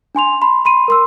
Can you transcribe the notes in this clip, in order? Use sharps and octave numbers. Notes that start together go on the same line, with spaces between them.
D4 G#5 C6 F7
A5 B5 C6
B5 C6 D#7
A#4 C6 E6